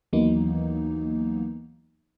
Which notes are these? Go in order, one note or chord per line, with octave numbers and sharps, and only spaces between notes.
D#2 E3 F#3 A#3 B3 D#4